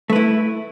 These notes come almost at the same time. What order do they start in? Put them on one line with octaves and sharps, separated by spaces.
A3 B4 E4